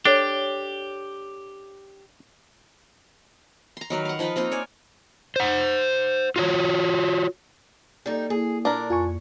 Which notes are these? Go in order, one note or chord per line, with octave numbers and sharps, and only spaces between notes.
D4 G4 A4 C#5
A#5 C6
D#3 F#3 A#4 B4
F5 F#5
F3 D#4 F4 B4
A#3 C4 D#4 F4
C#5 D5 G#5
C5 F#5
F4 F#4 C#5
G3 A#3 D#4 A4
A#3 E4 G#4
A#2 D4 A#4
F2 F4 G#5 C#6